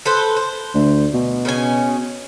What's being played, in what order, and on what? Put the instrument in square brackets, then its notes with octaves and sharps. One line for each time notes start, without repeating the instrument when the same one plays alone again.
[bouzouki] A4 B4 C5
C5
[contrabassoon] D2
B2
[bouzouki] C#3 C#4 G#5